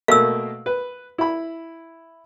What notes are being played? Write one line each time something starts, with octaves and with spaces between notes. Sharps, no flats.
B2 A3 A#3 F5 E6
B4
E4 B5